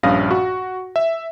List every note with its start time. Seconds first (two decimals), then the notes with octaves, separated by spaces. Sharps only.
0.03 A#1 G2 C#4 F5 D#6 A#6
0.31 F#4
0.96 E5